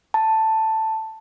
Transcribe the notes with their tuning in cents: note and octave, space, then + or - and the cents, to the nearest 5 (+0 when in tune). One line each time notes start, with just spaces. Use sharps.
A5 +5